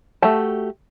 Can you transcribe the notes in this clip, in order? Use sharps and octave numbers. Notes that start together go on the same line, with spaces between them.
A3 F#4 G4 A5